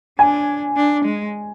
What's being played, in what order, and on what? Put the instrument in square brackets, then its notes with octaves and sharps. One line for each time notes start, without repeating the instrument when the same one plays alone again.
[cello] D4 [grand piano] G#5
[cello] D4
G#3